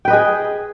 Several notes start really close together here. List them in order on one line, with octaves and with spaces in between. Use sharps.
G5 B4 D#5 G#4